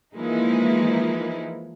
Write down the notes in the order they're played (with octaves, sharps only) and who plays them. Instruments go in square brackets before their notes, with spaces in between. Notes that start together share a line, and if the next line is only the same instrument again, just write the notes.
[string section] E3 F3 G#3 A#3 D#4 E4